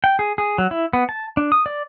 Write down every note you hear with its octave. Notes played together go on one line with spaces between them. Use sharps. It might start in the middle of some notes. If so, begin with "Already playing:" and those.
G5
G#4
G#4
F#3
E4
B3
A5
D4
D#6
D5